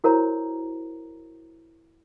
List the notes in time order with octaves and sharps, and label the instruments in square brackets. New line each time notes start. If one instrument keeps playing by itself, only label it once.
[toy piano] E4 F#4 A#4 C5 C#5 A#5